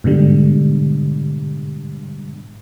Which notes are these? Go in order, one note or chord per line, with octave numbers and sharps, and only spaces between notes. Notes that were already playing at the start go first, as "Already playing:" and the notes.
G#2 B2 D3 G3